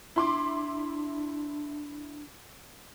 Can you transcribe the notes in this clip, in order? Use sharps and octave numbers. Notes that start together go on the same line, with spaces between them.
D4 E4 C6 D6